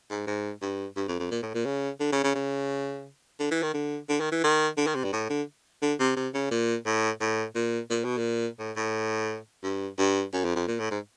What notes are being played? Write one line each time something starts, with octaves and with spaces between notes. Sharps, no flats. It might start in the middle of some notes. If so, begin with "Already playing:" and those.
G#2
G#2
G2
G2
F2
F2
A#2
A2
A#2
C#3
D3
C#3
C#3
C#3
D3
E3
D#3
D3
D3
D#3
E3
D#3
D3
D#3
C3
G2
A2
D3
D3
C3
C3
C#3
A#2
A2
A2
A#2
A#2
B2
A#2
A2
A2
G2
G2
F#2
F2
F2
A#2
A2
G#2